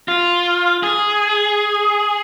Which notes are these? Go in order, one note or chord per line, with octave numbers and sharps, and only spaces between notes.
F4
G#4